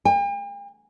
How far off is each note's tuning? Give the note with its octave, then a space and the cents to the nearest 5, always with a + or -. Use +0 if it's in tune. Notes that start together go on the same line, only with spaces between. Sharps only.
G5 +45